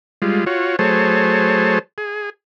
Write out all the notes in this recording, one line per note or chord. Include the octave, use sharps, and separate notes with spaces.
G3 G#3 F4
F4 F#4 C#5
F#3 A3 G#4 C5 C#5 A5
G#4